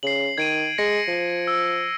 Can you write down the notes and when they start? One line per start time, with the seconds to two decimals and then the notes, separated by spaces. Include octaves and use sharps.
0.03 C#3 C7 F#7
0.38 D#3 G#6 D7 D#7
0.78 G#3 A#6 C#7
1.08 F3
1.47 E6